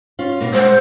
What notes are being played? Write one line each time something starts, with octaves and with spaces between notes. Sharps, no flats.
C#4 F4
B2 A#3
G#3 C5 F#5